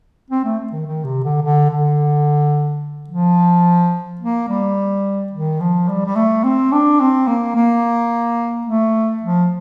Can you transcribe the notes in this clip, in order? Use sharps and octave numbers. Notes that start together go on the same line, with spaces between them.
C4
A3
D#3
D#3
C3
D3
D3
D3
F3
A#3
G3
D#3
F3
G3
G3
A3
C4
D4
C4
A#3
A#3
A3
F3